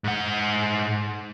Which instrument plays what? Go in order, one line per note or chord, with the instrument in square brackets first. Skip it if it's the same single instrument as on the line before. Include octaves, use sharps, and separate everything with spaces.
[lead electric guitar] G#2 F#5